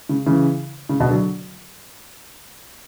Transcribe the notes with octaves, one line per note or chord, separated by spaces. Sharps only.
C#3
C#3 E3
C#3
B2 D3
D3 F#3